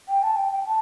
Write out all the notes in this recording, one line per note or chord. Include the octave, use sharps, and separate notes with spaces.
G5
A5
G5
G5
A5